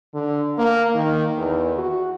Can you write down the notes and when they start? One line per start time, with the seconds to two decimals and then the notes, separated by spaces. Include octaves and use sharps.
0.14 D3
0.58 A#3
0.95 D#3
1.37 E2
1.78 F#4